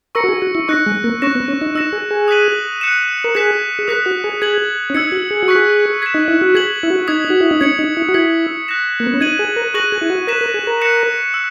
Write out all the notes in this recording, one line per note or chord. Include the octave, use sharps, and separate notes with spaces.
A#4 C#6 E6 A#6 C#7
F#4
G#4
F#4
E4
D#4 C#6 F#6 A#6 C#7
G#3
A#3
C#4 C#6 F#6 A#6 E7
B3
C#4
D#4
D#4 E6 A#6 E7
G#4
G#4
D#6 F#6 B6 D#7 F#7
F#6 C#7 E7
A#4
G#4 F#6 B6 E7
G#4
A#4 D#6 F#6 B6
F#4
G#4
G#4 G#6 B6 F#7
C#4
D#4 E6 G#6 C#7
F#4
G#4
F#4
C#6 F#6 B6
G#4
G#6 B6 E7
D#4
E4
F#4
G#4 G#6 B6 F#7
E4
F#4
D#4 D#6 G#6 B6
F#4
E4
D#4
C#4 G#6 C#7 F#7
D#4
E4
F#4
E4 G#6 B6 F#7
F#6 A#6 E7
A#3
B3
C#4
D#4 G#6 D#7 F#7
G#4
A#4
G#4 C#6 F#6 A#6 D#7 F#7
G#4
E4
F#4
A#4 F#6 B6 E7
A#4
G#4
A#4
F#6 A#6 C#7 E7
E6